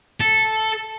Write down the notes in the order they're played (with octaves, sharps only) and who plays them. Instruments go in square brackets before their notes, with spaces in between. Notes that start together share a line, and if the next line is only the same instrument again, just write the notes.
[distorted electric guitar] A4